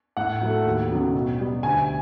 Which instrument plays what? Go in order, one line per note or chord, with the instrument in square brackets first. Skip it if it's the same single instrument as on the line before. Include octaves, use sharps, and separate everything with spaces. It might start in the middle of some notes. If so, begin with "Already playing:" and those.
[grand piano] A2 F#5
F#3 A3
D#2
C#3 F#3 B3
B2
G3 B3
D2 G#5